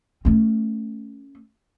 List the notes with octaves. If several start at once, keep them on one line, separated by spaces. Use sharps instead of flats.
A3 C#4